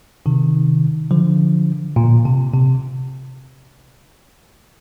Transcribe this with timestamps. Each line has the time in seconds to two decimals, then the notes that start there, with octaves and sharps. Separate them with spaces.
0.26 C3 D#3
1.11 D3 F3
1.96 A#2
2.25 C3
2.54 C3